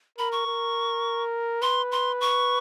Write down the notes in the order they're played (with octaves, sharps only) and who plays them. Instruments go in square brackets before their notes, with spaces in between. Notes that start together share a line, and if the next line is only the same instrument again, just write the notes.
[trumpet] A#4 [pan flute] B5
[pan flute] C#6
[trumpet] A#4
[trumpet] B4 [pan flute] C6
[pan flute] C6
C#6